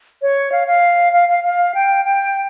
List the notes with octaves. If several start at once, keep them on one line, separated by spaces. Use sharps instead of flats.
C#5
F5
F5
F5
F5
F5
G5
G5